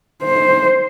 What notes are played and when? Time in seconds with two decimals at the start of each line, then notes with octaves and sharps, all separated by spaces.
0.24 C5